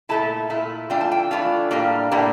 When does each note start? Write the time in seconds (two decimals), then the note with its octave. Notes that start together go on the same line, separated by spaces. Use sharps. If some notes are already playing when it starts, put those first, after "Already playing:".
0.09 A#2 A3 E4 A5
0.50 A#2 A3 E4
0.90 E3 A3 D4 F4 G5
1.01 A5
1.12 G5
1.31 E3 A3 D4 F4
1.71 A2 G3 A#3 D4 F5
2.11 A2 G3 A#3 D4